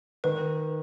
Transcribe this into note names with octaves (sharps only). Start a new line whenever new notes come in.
D#3 B4